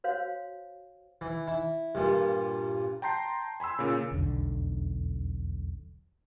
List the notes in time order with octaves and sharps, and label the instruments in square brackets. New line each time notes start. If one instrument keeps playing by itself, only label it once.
[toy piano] F#4 C5 C#5 F5
[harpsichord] E3
E4
G2 A#2
[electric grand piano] G5 A5 A#5 C6 G6 C7
G#5 B5 C6 E6
A#2 C#3
[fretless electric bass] E1 B1 F2 D3